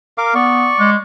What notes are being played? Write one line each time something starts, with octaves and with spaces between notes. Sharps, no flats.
A#4 F5 D6
B3 D5 C#6
G#3